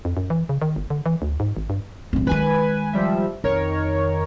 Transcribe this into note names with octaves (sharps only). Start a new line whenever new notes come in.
F2
F#2
E3
C#3
D#3
G1
D3
E3
D2
G#2
G#1
G2
D1 C4
D#3 G#3 B4 G#5
F3 G3 E5
F2 D#3 A#4 C#5